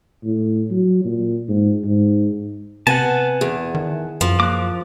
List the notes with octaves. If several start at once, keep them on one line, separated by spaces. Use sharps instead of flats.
A2
F#3
A#2
G#2
G#2
C3 B3 C4 F#5 G#5 A5
E2 G#4
D#3
F#2 F3
A#3 D6 F#6